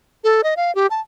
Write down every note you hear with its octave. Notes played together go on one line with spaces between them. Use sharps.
A4
D#5
F5
G4
A5